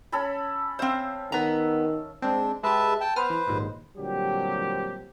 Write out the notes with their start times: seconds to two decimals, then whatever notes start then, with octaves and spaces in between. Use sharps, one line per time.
0.12 C#4 A4 B5
0.79 C4 C5 E5 F5
1.32 D#3 B3 A#5
2.22 G#3 C4 D4
2.63 G#3 G4 B4 E5 A5
3.01 G5 A5
3.16 B3 B4 C5 D#6 F6
3.30 E3
3.47 A#1 D#2 G#2
3.98 A#2 D3 F#3 G3 C4 G4